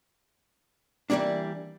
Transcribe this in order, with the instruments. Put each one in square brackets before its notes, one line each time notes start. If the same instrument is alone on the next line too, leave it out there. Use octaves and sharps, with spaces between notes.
[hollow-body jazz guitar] E3 G3 G#3 A#3 D4